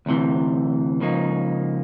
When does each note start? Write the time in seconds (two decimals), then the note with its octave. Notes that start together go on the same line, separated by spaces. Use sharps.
0.06 D2 C3 E3
1.00 C#2 C#3 F3 A#3 D#4